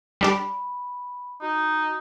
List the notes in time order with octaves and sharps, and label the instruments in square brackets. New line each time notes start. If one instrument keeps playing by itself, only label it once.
[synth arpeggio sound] G3 D4 G4 [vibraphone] B5
[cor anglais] D#4 [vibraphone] F#4